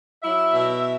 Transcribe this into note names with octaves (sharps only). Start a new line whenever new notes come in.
F#3 E4 E5
B2